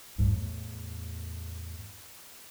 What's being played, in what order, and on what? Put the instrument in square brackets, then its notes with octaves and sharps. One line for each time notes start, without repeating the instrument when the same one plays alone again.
[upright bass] E2 A2